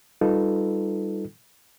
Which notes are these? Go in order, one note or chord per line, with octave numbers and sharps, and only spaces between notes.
G3 D#4 F4 A4 B4